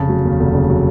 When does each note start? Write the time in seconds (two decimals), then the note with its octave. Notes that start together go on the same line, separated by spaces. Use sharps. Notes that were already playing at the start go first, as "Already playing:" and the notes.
Already playing: F1 C#3 A5
0.09 F#3
0.25 D#2
0.40 F1
0.55 C#3
0.70 F#3